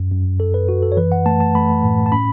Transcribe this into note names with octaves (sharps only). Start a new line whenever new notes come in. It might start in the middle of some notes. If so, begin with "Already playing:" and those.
Already playing: F#2
F#2
F#2 A4
B4
F#2 F#4
A4
C#5
E3 B4
F#5
A3 A5
A5
A3 B5
A2
A5
C#4 B5